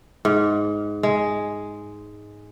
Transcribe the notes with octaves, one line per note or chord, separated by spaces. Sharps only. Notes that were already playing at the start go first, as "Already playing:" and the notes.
G#2
G#3